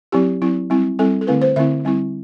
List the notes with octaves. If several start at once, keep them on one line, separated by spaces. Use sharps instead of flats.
F#3 C4 E4 G4
F#3 C4 E4
G3 C4 E4
G3 C4 E4 A4
A4
D3 A3 C4 E4 B4
C5
D3 A3 C4 E4 E5
G3 C4 E4